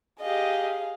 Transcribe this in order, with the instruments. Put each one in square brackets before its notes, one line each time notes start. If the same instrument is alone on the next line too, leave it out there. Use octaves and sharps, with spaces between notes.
[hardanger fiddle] G4 D#5 [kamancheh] G#4 F5